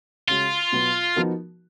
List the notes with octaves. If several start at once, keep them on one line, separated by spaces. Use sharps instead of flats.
C#3 G#3 C#4 F4 F#4
B2 F#3 B3
F3 B3 D#4 F#4 A#4